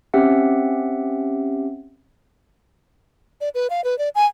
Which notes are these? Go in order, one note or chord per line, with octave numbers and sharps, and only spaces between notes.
C4 C#4 G4 E5 F#5
D5
B4
F5
B4
D5
G#5